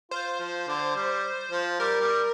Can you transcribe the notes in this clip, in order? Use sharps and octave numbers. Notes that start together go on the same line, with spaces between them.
F4 C5
F3
D3
G3
F3
G3 A#4
G3